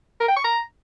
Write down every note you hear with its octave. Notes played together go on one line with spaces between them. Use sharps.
A#4
G5
C#6
A#5